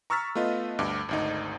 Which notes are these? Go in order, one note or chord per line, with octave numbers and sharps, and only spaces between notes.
A#5 C#6 E6 F6 A6 B6
A3 B3 F4 D#5
D2 G2 D6
G#1 D2 D#4